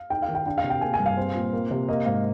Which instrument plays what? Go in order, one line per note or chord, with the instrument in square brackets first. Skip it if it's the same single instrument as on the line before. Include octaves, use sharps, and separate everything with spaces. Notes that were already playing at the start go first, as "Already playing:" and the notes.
Already playing: [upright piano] F5
[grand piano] D#4 [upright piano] G5
[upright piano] F5
[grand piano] D#3
[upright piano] G5
[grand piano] D4 [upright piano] G5
[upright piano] F5
[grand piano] C3
[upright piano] G5
[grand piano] A#3 [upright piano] G#5
[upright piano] G#5
[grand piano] G2
[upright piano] F5
[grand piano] C4
A#2
A#3
C3
[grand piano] A#3 [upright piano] D#5
[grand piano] G#2 [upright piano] F5